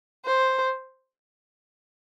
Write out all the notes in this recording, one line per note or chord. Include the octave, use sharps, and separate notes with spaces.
C5